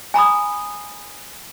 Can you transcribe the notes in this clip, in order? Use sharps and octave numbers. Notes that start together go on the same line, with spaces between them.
G#5 A#5 B5 D#6